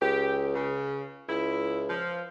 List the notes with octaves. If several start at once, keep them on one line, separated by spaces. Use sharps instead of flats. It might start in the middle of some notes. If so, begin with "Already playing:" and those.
C#2 G4
C#3
C#2 E4
F3